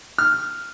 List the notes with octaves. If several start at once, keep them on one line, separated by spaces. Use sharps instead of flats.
F6